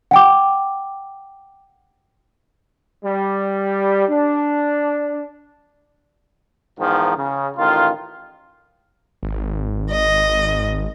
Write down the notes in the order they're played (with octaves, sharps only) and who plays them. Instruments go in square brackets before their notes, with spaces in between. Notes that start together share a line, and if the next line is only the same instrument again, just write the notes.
[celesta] F#5 G5 D6
[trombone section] G3
D4
E2 G#2 D#3 F3
C#3
A1 D#3 F4
[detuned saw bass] G#1
[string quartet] D#5